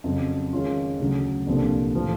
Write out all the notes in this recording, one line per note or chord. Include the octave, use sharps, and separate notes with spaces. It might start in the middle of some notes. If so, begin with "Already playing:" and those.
F2 C#3 F#3
D#3 G#3 C#4 F4
D2 C#3 F#3
C2 A#2 F3 A3 D4
A2 F3